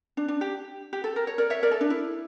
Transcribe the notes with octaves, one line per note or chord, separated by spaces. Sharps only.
D4
D4
G4
G4
A4
A#4
C#5
A#4 D5
C#5 E5
A#4 D5
A4
D4
E4